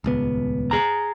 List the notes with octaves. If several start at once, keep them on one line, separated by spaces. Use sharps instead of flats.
D#1 C#2 B3
G#4 A#5